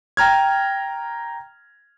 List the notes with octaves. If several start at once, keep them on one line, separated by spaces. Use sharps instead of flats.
G5 A#5 F6 G#6